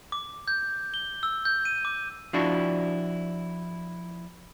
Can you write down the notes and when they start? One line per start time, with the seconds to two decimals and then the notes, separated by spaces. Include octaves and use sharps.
0.12 D6
0.48 G6
0.94 G7
1.23 E6
1.45 G6
1.65 D#7
1.85 D6
2.33 F3 D4 E4 F#4